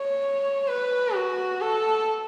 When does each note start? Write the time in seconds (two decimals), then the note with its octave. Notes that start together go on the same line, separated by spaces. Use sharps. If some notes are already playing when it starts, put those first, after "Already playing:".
Already playing: C#5
0.68 B4
1.15 F#4
1.61 A4